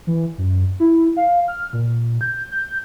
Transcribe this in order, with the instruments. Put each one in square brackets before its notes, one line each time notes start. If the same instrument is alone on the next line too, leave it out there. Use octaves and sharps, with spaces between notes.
[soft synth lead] E3
F#2
E4
F5
F6
A#2
G6
G6